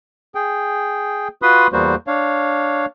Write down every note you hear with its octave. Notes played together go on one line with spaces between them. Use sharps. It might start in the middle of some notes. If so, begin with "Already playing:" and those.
G#4 G5
F4 F#4 B4 B5 C6 D#6
E2 G3 A#3 B3 F#4 C5
D4 C#5 F5